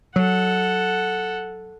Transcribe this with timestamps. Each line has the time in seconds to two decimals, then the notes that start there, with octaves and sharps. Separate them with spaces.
0.16 F#3 A4 F#5